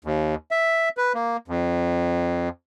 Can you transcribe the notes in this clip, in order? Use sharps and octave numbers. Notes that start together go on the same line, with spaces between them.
D#2
E5
B4
A#3
F2